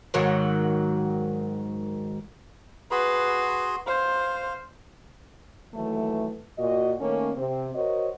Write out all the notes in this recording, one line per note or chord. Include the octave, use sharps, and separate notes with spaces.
G#2 D#3 F#3
F#4 G#4 B4 C6
C5 F5
D#2 E3 F#3 A3
A#2 F#4 D#5
D#3 A3 A#3 C#4
C3 C4
F#4 A#4 C5 C#5 D#5